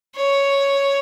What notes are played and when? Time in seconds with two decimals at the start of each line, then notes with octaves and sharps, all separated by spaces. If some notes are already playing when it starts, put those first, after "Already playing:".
0.16 C#5